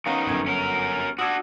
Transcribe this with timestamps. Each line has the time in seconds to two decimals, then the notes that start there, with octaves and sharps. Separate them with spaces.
0.06 D#3 B3 C#4 D#4 F5 A#5
0.26 G1 F#2 G#6
0.46 C#4 A#4
1.19 D4 F#4 D#6 E6 G#6